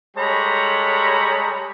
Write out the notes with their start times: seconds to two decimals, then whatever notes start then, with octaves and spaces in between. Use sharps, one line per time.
0.17 G3 G#3 A4 C#5 A#5 B5